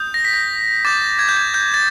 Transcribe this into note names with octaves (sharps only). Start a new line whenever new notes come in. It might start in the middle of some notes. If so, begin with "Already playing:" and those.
Already playing: D#6 G6
A#6
B6
A#6
D6 G6 A6
G#6
G6
G#6
G6
A6